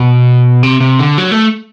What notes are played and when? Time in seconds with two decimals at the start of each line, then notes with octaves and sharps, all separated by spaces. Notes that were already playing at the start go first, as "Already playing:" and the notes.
Already playing: B2
0.63 C3
0.81 C3
0.99 D3
1.18 F#3
1.32 A3